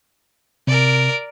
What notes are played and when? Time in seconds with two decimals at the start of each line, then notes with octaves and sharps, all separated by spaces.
0.67 C3 A#4 D5